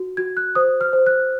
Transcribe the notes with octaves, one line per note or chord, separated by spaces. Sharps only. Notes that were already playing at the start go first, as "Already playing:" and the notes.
Already playing: F#4
F#4 G#6
F#6
C5 D#6
F6
C5
F#6